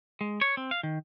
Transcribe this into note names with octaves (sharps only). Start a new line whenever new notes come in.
G#3
C#5
C4
F5
D#3